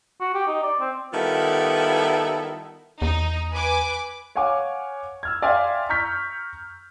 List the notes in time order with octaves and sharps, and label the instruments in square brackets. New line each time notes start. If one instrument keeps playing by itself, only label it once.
[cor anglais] F#4
G4
D#4
D5
C4
[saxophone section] D#3 G3 B3 E4 F4 A4
[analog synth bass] E2 [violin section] D#4
[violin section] B4 G#5 D6
[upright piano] C#5 F5 F#5 G#5 C#6 D6
E6 F6 G#6
D5 E5 F5 G5 G#5 C6
A#5 C#6 F6 G6 B6